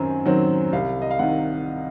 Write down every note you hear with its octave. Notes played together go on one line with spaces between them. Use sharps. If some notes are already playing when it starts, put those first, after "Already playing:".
Already playing: F#2 D#3 F#3 C4 G#5 A#5
D#3 F#3 C4
C2 F5
D#5
F5
C3 D#3 F#5